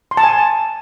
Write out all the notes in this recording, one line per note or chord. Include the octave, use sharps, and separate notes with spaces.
C6
A5
G#5